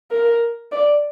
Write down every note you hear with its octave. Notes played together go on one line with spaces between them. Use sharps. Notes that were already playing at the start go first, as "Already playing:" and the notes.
A#4
D5